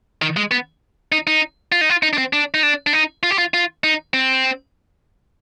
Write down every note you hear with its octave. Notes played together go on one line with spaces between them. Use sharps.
D#3
G#3
B3
D#4
D#4
F4
D#4
F4
D#4
D4
C4
D4
D#4
D4
D4
D#4
F4
G4
F4
F4
D#4
C4